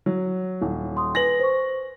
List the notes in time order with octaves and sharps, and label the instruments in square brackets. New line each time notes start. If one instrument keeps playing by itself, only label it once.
[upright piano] F#3
D#1
[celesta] C6 D#6
[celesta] B4 G#5 [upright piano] A#6 F#7
[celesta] C5 C#6